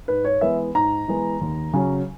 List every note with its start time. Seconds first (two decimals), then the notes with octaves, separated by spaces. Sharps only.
0.08 G#2 B4
0.25 C#5
0.41 E3 G#3 B3 E5
0.75 G#2 A#5
1.08 E3 G#3 B3
1.41 D#2
1.74 C#3 F#3 C#4